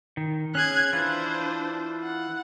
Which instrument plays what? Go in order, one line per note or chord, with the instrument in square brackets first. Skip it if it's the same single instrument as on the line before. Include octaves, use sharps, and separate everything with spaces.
[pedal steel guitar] D#3
[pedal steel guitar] C#4 G#4 [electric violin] F#6 G#6
[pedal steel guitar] E3 F4 B4 [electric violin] D4 C5
[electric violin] F#5